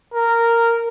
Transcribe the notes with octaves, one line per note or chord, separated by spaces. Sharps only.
A#4